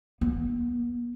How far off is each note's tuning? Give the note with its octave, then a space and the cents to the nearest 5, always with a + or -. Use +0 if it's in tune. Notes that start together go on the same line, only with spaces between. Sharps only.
B3 -45